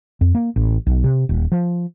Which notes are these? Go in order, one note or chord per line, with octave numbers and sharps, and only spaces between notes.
F2
A#3
A1
B1
C3
D#1
F3